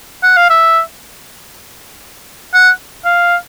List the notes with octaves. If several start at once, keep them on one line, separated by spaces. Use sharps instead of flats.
F#5
F5
E5
F#5
F5